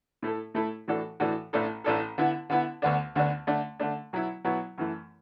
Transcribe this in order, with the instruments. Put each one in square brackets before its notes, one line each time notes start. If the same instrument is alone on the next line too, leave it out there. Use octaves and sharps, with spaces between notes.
[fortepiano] A2 A3 E4 A4
A2 A3 E4 A4
A2 E3 D4 F#4 A4
A2 E3 D4 F#4 A4
A1 A2 A3 D4 A4
A1 A2 A3 D4 A4
D3 B3 E4
D3 B3 E4
D2 D3 B3 D4
D2 D3 B3 D4
D3 A3 D4
D3 A3 D4
B2 F#3 B3 E4
B2 F#3 B3 E4
F#2 E3 A3